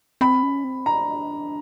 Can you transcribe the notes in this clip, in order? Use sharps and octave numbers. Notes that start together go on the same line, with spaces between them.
C4 B5
C#4
C4
D4 A#5